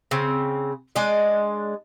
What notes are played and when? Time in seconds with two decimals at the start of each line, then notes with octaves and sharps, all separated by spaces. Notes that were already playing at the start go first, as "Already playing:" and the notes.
0.11 C#3 C4
0.96 G#3 D4 D5 D#5